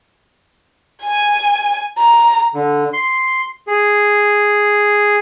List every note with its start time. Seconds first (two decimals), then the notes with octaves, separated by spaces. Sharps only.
1.03 G#5
1.98 A#5
2.54 D3
2.93 C6
3.67 G#4